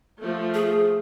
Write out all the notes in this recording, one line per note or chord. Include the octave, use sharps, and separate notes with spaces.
F3 A3
G#4